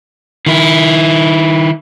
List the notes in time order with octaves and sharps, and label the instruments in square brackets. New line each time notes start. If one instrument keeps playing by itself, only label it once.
[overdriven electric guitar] D#3 E4